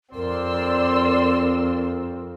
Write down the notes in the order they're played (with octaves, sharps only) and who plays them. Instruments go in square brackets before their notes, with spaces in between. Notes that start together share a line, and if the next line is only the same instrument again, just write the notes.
[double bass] F2 [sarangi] C4 [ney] A#4 [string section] D5 C6 E6